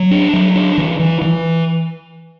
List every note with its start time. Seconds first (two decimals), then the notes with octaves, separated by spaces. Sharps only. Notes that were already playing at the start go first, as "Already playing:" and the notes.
Already playing: F#3
0.11 D4
0.33 F#3
0.56 D4
0.78 E3
0.99 E3
1.22 E3